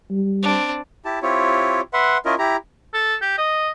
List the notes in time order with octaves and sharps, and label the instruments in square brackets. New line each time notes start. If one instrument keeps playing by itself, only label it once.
[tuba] G3
[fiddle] C4 D4
[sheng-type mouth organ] E4 G4 A5
C4 E4 F4 G4 C#5
B4 E5 F#5 C6
C#4 E4 F4 A#4 D#5
E4 G4 A#5
[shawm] A4
G4
D#5